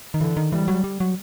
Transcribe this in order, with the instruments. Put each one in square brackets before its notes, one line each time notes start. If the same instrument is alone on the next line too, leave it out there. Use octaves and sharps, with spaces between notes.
[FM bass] D#3
[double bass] D3 [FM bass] E3
[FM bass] D#3
[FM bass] E3 [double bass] G3
[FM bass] F#3
G3
F#3